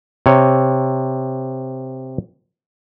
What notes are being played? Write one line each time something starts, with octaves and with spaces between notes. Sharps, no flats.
C3 C#5